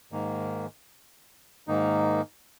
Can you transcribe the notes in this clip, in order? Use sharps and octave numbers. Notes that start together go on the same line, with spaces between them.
G#2 D#3 A#3
G#2 D#3 A#3 D#4